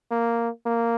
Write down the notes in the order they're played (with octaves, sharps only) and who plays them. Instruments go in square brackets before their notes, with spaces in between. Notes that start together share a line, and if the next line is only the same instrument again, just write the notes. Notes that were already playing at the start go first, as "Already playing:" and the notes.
[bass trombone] A#3
A#3